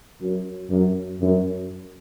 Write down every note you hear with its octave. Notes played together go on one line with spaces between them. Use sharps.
F#2
F#2
F#2